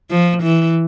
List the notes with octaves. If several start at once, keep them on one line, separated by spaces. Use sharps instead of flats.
F3
E3